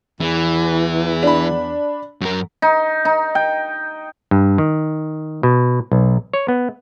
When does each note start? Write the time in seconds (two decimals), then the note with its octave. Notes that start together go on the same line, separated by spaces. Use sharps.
0.21 E2 E3
1.23 D4 B5
2.21 F#2 A#4
2.62 D#4
3.05 D#4
3.35 G5
4.31 G2
4.58 D#3
5.43 B2
5.92 B1
6.34 C#5
6.48 B3